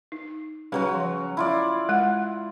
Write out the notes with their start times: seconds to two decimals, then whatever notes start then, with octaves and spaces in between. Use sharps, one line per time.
0.12 D#4
0.72 C#3 F#3 G3 F#4 B4
0.94 F3
1.37 E4 F4 D5
1.89 G#3 F#5